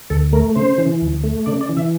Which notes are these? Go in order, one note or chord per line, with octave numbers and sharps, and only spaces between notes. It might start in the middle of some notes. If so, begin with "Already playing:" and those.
D2 A4
A3 A#4
C#3 C5
E3
D2
A3
C#3 D5
D5
E3
E5